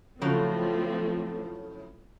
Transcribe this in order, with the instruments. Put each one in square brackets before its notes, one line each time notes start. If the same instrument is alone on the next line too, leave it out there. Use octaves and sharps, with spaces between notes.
[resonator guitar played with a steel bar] A2 C#3 F#3 [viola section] F3 A3 C4